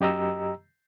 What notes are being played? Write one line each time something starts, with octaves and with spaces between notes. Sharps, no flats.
F#2 G4 D#5 A#5 E6